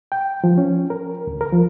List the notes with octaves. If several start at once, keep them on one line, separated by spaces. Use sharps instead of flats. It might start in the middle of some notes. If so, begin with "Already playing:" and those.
G5
F3
C#4
A#4
D2
A#4
F3